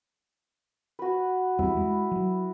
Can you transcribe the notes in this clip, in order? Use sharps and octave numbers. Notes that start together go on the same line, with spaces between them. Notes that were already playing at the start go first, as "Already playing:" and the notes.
F#4 B4
E2 G3 C4 E4
G#3
F#3